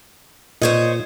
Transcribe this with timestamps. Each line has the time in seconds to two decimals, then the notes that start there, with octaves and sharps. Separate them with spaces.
0.62 A#2 C5 C#5 D#5